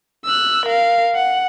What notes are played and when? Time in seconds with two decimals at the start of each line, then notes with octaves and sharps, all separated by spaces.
0.25 E6 F#6
0.66 A#4 F5
1.15 F#5